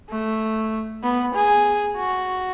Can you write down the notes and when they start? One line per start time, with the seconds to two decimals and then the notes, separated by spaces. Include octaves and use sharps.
0.10 A3
1.04 B3
1.35 G#4
1.97 F#4